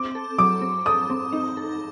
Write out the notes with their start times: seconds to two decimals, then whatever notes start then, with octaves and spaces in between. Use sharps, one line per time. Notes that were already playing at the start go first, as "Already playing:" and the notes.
Already playing: C4 D6
0.15 A4
0.38 F#3 D6
0.61 C4
0.86 A4 D#6
1.10 C4
1.32 D#4
1.57 A4